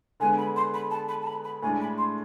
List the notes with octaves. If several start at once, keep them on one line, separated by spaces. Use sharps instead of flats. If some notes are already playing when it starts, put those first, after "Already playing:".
D3 G#3 B3 G#5
B5
C6
B5
A5
B5
A5
B5
B5
A2 G#3 D4 G#5
B5
C6